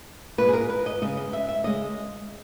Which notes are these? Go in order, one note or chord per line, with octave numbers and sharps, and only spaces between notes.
A#2 G#3 B4
G#4
A#4
B4
D#5
C#3 G#3 D#5
D#5
E5
E5
C#3 G#3 D#5